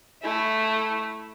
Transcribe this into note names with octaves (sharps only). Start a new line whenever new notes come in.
A3 E4